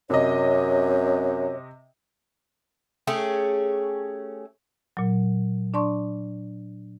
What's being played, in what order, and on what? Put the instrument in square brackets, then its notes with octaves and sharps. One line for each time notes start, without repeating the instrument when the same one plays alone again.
[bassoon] F#2 [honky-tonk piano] C3 D#5 [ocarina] C#5
[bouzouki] A3 C#4 G4 G#4
[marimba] A#2 F#3
D4 D5 A5 C6 C#6